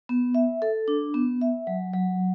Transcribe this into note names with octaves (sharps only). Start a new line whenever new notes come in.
B3
E5
A4
D4
B3
E5
F#3
F#3